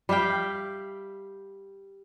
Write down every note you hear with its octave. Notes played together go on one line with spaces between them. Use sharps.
G3 E5 F5 G5